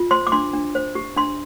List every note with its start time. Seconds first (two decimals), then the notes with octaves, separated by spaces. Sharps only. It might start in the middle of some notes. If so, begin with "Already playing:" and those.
Already playing: F4
0.11 C5 C6
0.27 D6
0.32 D4 C6
0.53 D4
0.75 C5
0.95 G4
1.16 D4 C6